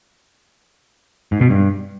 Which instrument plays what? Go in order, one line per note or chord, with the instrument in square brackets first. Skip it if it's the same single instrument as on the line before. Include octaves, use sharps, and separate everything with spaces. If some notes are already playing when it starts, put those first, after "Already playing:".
[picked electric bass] G#2
B2
G2